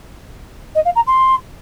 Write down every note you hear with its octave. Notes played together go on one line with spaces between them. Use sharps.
D#5
F5
A#5
C6